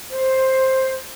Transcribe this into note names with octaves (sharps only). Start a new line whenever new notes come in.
C5